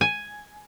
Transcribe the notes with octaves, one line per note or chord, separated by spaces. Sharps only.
G#5